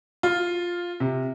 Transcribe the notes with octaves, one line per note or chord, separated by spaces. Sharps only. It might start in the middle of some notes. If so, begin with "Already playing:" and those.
F4
C3